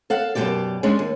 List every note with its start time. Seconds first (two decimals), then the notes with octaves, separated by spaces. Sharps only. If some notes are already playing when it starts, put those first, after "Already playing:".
0.10 A4 F5 F#5
0.35 F#2 B2 D#3 F3 G4 D5
0.83 G#3 C#4 D4
0.99 D#2